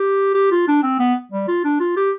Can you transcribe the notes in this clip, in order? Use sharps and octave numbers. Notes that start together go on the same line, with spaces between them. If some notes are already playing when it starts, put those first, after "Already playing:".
Already playing: G4
G4
F4
D4
C4
B3
G3
F4
D4
F4
G4